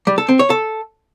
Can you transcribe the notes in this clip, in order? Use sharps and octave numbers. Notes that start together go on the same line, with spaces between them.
G3
A4
C4
C#5
A4